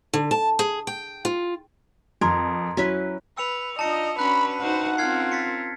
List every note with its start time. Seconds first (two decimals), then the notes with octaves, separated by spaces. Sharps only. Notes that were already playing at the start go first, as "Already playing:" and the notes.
0.13 D3
0.31 A5
0.59 G#4
0.87 G5
1.25 F4
2.21 F2 A#4 A#5 C6 G#6
2.77 F#3 C#4 E4 B4
3.37 B4 E6 C#7 F7
3.79 D4 D#4 F4 D#5 A5 C#7
4.19 C#4 D4 F#4 B4 B5 F#6
4.61 D#4 F#4 C5 F#5
4.98 C4 C#4 F4 A#4 F6 G#6 C7
5.32 A6 B6 C#7